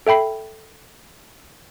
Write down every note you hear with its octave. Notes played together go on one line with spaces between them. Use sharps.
A4 E5 G5 B5 C7